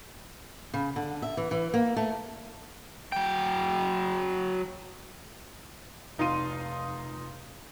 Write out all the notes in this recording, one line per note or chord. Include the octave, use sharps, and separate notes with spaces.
C#3
D3
E5
E3
E3
A#3
A3
F#3 G5
F1 D#4 F4 C6 D#7